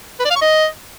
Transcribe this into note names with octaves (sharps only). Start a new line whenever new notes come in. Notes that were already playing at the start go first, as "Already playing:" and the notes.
B4
D5
F5
C#6
D#5